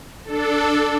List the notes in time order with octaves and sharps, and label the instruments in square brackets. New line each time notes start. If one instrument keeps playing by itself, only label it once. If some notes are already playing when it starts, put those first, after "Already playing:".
[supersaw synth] D4 A4